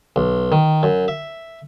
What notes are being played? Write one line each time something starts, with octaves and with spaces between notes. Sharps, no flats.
B1
D#3
F#2
E5